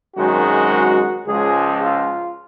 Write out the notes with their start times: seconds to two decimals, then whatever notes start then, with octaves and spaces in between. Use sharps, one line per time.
0.15 G#1 F#2 D#3 G#3 F#4
1.26 C#2 C#3 F3 G#3 G#4
1.81 F4